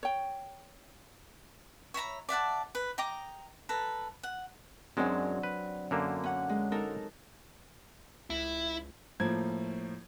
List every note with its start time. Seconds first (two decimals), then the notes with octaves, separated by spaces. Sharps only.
0.03 C#5 G5
1.94 C#5 E5 A#5 B5
2.29 D5 E5 F#5 A5
2.75 B4
2.98 D#5 G5 A#5 D6
3.69 A4 B4 A#5
4.23 F#5
4.97 F#2 F#3 G#3 C4 D4
5.43 B4
5.91 F#2 D3 A#3
6.24 C#4 F#5
6.49 G#3
6.72 D#4 A4 A#4
8.30 C#2 E4
9.20 A2 F3 A#3 G#6